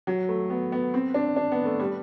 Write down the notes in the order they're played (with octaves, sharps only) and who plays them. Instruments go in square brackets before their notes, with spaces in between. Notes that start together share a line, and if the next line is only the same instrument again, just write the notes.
[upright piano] F#3
A3
B3
B3
C4
D4
D4
B3
A3
G3